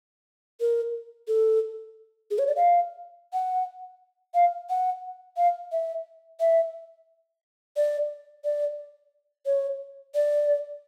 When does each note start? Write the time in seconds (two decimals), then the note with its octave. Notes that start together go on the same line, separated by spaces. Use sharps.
0.60 A#4
1.28 A4
2.31 G#4
2.39 C#5
2.47 D5
2.56 F5
3.33 F#5
4.34 F5
4.70 F#5
5.37 F5
5.72 E5
6.40 E5
7.76 D5
8.44 D5
9.46 C#5
10.15 D5